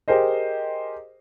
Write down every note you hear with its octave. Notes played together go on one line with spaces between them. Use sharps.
G4 G#4 A#4 C5 D#5